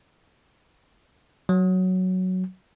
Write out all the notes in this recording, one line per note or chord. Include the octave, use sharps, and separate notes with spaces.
F#3